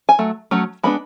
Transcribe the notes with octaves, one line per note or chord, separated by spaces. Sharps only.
G#5
F#3 A3
F#3 A3 C#4
G#3 B3 D4 B5